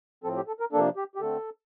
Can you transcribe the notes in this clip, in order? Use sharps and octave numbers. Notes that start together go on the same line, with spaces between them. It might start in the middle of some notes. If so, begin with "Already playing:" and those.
A2 F3 C4 A4
G4
A4
A#4
C3 F3 A#3 D4 A4
G4
G4
D3 A3 C4 A4